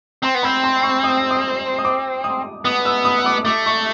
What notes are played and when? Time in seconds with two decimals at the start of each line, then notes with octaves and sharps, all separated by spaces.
0.23 C4 C6
0.35 B3
0.43 C4 B5
0.64 C6
0.83 C#6
1.04 D#6
1.31 D#6
1.78 D#6
1.85 D6
2.24 D#6
2.65 B3 D#6
2.85 E6
3.05 D#6
3.26 D6
3.45 A3 D6
3.66 C#6